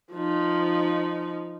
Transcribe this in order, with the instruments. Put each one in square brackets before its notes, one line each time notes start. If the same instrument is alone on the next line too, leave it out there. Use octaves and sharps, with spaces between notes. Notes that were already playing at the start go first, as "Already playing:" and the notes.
[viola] F3 D#4